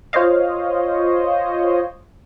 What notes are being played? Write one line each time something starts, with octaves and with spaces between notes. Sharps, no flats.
F4 C5 C#5 D#5 F5